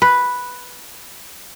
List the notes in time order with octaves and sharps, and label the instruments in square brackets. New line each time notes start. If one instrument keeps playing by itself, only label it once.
[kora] B4